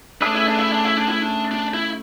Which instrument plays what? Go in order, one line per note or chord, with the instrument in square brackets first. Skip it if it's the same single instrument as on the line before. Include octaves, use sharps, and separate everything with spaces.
[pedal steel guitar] A3 C#4 G#4 B4 E5 [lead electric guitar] D4
[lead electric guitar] E4
D4
E4
D4
E4
D4
E4
D4
D4
E4